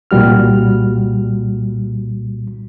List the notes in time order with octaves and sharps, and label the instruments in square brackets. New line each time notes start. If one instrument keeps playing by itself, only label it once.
[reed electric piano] C2 A#2 G3 F#4 F6